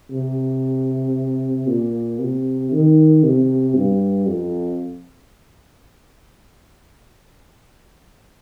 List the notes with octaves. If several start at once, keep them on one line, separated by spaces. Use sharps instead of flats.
C3
A#2
C3
D#3
C3
G2
F2